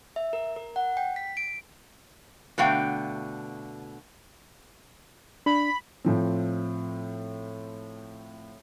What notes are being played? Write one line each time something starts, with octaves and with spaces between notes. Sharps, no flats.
E5
A#4
A#4
F#5
G5
B6
D7
B2 D3 A3 F5 G5
D4 B5
A2 F3 C4